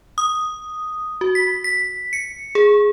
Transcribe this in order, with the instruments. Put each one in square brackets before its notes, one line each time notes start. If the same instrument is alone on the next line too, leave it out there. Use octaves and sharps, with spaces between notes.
[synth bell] D#6
F#4
B6
B6
C#7
G#4